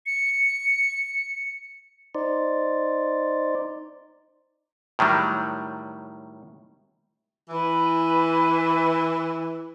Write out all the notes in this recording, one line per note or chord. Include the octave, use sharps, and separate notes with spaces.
C#7
D#4 C5 D5
A2 D#3 F#3 G3
E3 B4 G#5 B5